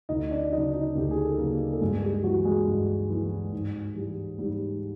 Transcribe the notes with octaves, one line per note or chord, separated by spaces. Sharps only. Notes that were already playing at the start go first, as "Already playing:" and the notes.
D2 D#4 D#5
D4 D5
C#3 F#3 D#4 D#5
D#4 D#5
D2 G4
G#4
A4
C#3 F#3 A#3 A#4
A4
G2 G#3 G#4
G#4
G3 G4
E3 F#3 G#3 F#4
G#3 G#4
G2
E3 G#3
G#2
E3 G3
G#2 G3 G4